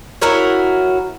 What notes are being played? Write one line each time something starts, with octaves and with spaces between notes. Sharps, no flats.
E4 F#4 A#4 C#5